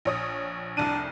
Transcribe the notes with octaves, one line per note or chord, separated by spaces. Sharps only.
A#1 C#5 D#6
F1 C2 D4 D#7